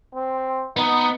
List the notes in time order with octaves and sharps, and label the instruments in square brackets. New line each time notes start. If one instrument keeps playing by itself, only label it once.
[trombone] C4
[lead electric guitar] B3 [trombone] D#4